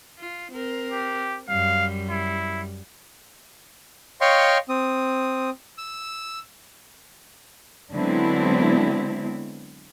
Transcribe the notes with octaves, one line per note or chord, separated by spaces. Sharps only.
F4
C4 A#4
G4
F#2 G3 F5
E4
C#5 D#5 F5 G5 C6 C#6
C4 D#6
E6
D3 F#3 G#3 B3 C4 E4